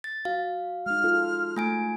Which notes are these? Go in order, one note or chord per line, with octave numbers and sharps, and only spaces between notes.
A6
F#4 F5
G#3 D#4 F6
F4 A4
A3 G#5 D7